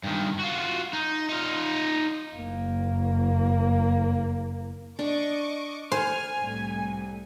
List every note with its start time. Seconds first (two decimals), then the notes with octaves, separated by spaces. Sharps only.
0.03 G2 D#3
0.40 F4 F#4
0.93 D#4
1.29 D#4 F4
2.35 F#1 A#3
4.99 D4 D#5 C#6 D6
5.92 C5 G#5 F6
6.41 C2 A2